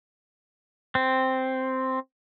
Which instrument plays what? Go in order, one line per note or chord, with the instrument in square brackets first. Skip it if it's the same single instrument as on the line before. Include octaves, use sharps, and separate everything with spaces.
[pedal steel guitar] C4